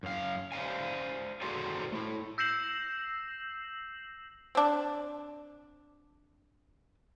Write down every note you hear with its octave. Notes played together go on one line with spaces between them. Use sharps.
F#2 F5
C5 D5 F5 G#5
F#4 G#4 A4 C5 D5 G#5
A3 E4
E6 G6 A#6 C7 E7 F#7
C4 D4